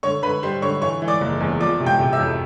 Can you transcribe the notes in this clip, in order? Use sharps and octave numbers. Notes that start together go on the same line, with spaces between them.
D3 C#5 C#6
D3 B4 B5
G3 C5 C6
D3 C#5 C#6
E3 C#5 C#6
E3
D5 D6
F#1
E2
F3 D5 D6
C3
G5 G6
C3
E5 E6
F2